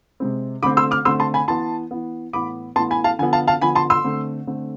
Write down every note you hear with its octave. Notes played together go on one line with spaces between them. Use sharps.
C3 G#3 C4
D3 A3 C4 B5 D6
C6 E6
D6 F6
D3 A3 C4 C6 E6
A5 C6
G#5 B5
E3 B3 A5 C6
E3 B3
A2 E3 B3 B5 D6
A2 E3 B3 A5 C6
G#5 B5
F5 A5
D3 F3 B3 G#5
F5 A5
F5 A5
D3 F3 B3 G#5 B5
A5 C6
C6 E6
D3 A3 C4
D3 A3 C4